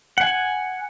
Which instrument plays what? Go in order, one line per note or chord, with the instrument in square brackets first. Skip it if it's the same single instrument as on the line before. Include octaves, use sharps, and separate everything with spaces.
[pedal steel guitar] F#5 G#5